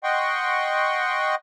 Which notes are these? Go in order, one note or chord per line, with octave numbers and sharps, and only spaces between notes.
D#5 F#5 G5 C6 C#6